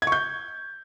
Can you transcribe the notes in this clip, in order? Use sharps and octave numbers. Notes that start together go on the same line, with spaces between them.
G#6
C#6
G6